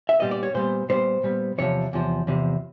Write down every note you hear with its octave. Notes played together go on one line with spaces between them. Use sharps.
E5
A#2 G3 B3 D#5
D5
C#5
A#2 G3 B3 C5
A#2 G3 B3 C5
A#2 G3 B3
E2 C3 F3 C#5
E2 C3 F3
E2 C3 F3